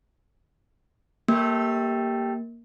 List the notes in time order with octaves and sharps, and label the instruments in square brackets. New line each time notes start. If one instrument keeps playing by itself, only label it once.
[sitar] G3 A3 [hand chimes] A#3